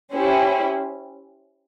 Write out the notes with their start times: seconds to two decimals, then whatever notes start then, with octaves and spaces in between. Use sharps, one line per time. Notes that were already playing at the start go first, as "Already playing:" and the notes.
0.13 C#4 E4 G4 C5